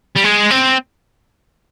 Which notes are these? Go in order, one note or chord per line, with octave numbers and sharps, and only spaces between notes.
G3
G#3
C4